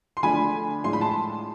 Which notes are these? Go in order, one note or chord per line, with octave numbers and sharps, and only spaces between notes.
C6
D3 F3 A3 D4 G#5 B5
A2 F3 G#3 D4 F4 C6
B5
A5 C6